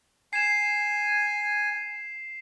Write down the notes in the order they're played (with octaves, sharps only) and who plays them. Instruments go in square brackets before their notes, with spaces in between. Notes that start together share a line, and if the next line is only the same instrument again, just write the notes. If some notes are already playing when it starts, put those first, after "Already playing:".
[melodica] G#5 [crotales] C7 E7